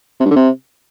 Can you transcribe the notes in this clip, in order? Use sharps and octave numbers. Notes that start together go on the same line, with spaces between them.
C3
G2
D3
C3